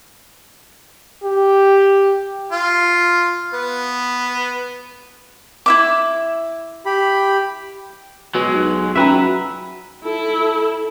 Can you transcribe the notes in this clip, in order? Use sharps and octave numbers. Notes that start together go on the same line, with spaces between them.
G4
F4
B3
E4 E5 D6
G4 B5
B2 F#3 G#3
B1
F#3 C#4 B4 E5 G5 A#5
E4 A4